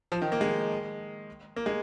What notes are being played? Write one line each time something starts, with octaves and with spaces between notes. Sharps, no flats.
F3
D#3
A#3
G#3
A#3
G#3